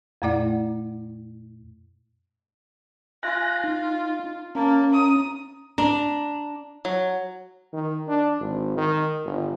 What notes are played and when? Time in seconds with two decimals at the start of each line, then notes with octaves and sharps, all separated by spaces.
0.22 F2 A#2 A3 E4 D5 F#5
3.23 F4 G#5 F#6 A#6
3.64 D#4
4.55 A#3 C#4 A5
4.90 A#5 D#6
5.78 D4 A#5
6.85 F#3
7.73 D#3
8.08 D4
8.40 G#1
8.77 D#3
9.24 G1